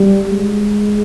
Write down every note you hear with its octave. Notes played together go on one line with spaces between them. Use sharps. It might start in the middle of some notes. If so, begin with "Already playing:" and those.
Already playing: G3
G#3